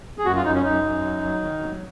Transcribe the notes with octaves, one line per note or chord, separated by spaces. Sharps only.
G#4
F#2 F#4
F4
F#2 D#4
C#4
F#2 D#4
F#2
F#3
F#3
D#3
F#3